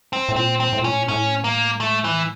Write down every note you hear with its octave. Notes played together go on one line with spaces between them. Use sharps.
C4
A2
A#2 C4
C4
A2
A#2 C#4
A2
A#2
A2 C#4
A#3
A3
E3